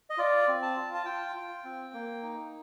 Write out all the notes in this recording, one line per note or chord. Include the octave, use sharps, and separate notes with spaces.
D#5
F4 D5
C4
A5
F4
A5
F4 G5
F4
C4
A#3
D#4